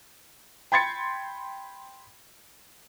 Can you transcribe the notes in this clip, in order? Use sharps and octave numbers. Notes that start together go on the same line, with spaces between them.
G5 B5 C6 G#6 A6 C#7